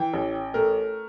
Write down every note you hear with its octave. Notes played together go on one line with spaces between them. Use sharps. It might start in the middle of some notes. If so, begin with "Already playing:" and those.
Already playing: E3 G5
A1
A3 A#4